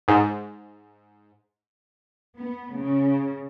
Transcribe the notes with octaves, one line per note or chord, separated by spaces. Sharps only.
G#2
B3
C#3